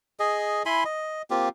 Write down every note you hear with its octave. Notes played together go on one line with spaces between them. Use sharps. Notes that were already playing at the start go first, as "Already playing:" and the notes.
G#4 D#5
E4 G#5 B5 C6
D#5
A#3 C4 F4 G4